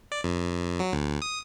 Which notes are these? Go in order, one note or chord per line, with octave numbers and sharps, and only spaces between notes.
D5
F2
F#3
D2
D#6